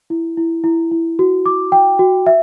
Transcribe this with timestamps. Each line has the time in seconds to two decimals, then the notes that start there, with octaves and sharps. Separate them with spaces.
0.10 E4
0.37 E4
0.64 E4
0.91 E4
1.19 F#4
1.46 D6
1.72 G5
1.99 F#4
2.26 E5